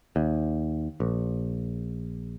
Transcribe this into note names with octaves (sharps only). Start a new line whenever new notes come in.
D#2
A#1